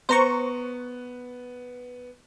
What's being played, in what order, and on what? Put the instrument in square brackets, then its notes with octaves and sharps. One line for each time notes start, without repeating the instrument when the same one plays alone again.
[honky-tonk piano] B3 [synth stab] C5 A#5 C#6